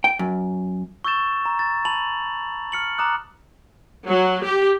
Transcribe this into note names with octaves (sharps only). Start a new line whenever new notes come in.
G5
F#2
C#6 E6 G6 A6 E7
A#5
A6
A5 B5 F7 F#7
F6 C#7 F#7
A#5 D6 D#6 F#6
F#3
G4